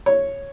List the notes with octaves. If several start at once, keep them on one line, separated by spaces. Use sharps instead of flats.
C#5